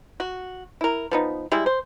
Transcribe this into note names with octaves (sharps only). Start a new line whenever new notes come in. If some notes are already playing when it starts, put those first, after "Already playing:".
F#4
E4 A#4
F3 B3 D#4
G3 G#3 E4
C5